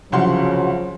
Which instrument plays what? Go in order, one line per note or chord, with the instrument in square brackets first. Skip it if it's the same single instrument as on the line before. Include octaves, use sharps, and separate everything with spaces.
[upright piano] C2 F#5 C6 [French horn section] C#3 F#3 [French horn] F3